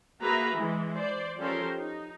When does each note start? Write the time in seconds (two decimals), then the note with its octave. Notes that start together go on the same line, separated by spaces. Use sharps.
0.21 A#3 F#4 G#4 B4 E5 A#5
0.54 E3 G#3
0.94 C5 D5
1.39 F3 C#4 G4 A4 A#4 C5
1.79 D#4